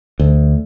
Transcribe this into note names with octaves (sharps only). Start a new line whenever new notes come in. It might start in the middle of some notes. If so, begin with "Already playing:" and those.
D2